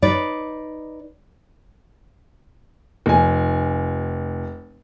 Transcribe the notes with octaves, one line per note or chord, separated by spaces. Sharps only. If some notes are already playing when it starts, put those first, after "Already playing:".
D#4 B4 D5
F1 G#5